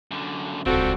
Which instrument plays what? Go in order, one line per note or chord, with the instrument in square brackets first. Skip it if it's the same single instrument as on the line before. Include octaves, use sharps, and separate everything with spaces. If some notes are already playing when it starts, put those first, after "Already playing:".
[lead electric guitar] F#2 D3
[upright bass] D#1 C#2 [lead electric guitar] F3 G3 [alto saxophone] C4 [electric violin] F#4 A4